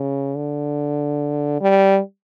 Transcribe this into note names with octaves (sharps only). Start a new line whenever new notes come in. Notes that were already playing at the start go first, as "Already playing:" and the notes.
Already playing: C#3
D3
G3